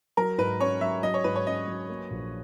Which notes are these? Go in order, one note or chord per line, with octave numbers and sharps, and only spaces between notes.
F#3 A#4
G#2 B4
C#4 C#5
F#3 E5
F#3 D#5
C#5
G#2 B4
C#5
C#4 D#5
F#3
A#3
A#1